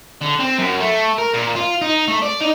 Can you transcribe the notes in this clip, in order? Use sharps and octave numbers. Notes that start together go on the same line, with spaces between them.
D3
C4
F#2
A3
A#4
A#2
F4
D#4
A3
D5
D#4